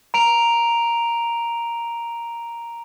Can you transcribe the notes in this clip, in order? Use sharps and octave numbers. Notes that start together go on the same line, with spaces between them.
A#5 D7 F7